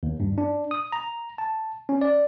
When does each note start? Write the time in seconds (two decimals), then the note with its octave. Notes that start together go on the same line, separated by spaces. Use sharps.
0.03 D#2
0.20 G2
0.38 D4
0.71 D#6
0.92 A#5
1.38 A5
1.89 C#4
2.01 D5